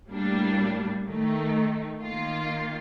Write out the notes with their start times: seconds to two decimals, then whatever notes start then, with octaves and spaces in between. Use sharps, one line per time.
0.11 A2 G3 A#3 D4
1.07 D#3 A3 D#4
2.03 D#3 A#3 F4